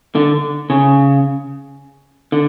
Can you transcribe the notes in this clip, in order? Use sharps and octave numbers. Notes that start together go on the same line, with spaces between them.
D3
C#3
D3